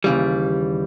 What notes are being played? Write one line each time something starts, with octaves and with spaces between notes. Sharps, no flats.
D#2 C#3 E3 G3